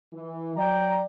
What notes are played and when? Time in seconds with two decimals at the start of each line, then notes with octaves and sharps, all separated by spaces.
0.13 E3
0.56 F#3 D5 G5 A#5